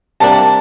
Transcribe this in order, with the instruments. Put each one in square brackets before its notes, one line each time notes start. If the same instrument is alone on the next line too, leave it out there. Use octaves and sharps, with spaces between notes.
[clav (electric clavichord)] C3 G3 A#3 D4 [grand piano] A5